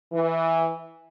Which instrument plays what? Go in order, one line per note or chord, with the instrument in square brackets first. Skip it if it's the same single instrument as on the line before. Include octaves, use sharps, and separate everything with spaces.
[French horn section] E3